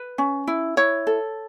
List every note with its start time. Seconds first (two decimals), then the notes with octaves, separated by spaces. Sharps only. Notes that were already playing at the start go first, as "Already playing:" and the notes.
Already playing: B4
0.18 C#4
0.47 E4
0.77 E4 C#5
1.07 A4